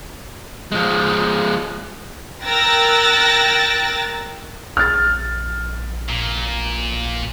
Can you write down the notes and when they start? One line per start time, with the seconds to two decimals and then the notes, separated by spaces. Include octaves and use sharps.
0.72 F3 G#3
2.45 A#4 G5 E6 F#6 A6 A#6
4.77 A#1 F6 A6
6.09 A#2